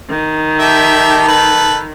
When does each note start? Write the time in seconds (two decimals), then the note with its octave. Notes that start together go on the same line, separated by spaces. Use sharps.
0.10 D#3
0.59 G4 A4 E5
1.28 A4 B4